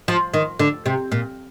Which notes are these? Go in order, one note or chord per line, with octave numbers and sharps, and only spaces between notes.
F3
D#3
D3
C3
A#2